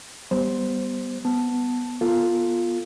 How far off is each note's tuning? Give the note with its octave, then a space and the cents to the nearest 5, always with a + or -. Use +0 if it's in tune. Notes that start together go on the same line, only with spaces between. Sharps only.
G3 +0 B3 +0 C5 +0
B3 +0 A5 +0
B3 -25 F4 +0 A4 +15